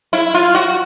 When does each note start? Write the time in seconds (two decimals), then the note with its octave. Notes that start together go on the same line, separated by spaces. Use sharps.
0.13 E4
0.34 F4
0.55 F#4